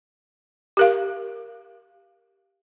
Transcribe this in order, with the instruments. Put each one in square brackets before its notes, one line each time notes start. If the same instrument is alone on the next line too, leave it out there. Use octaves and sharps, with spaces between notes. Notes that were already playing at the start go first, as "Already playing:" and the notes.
[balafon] G4 A#4 F5